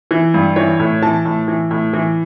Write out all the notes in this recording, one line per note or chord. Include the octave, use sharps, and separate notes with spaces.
E3
G2
E3 C#5
A2
E3 A5
A2
E3
A2
E3